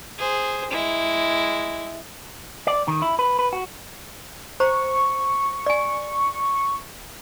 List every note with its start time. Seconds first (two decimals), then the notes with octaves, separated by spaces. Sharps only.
0.18 G#4 C5
0.71 G#3 E4
2.67 D5
2.88 D#3
3.02 E4
3.19 B4
3.39 B4
3.53 F#4
4.60 C5 A#5 C#6
5.66 D5 G#5